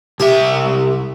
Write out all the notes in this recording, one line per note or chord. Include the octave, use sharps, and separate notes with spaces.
C2 G4 E5